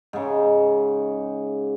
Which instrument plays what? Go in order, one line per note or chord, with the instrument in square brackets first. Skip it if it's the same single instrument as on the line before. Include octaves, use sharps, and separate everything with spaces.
[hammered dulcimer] G#2 C#3